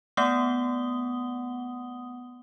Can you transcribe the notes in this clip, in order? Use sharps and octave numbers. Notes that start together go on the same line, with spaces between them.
A3 B3 F#5 D#6 G7